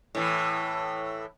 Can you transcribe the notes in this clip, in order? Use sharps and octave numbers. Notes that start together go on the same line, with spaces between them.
A2 E3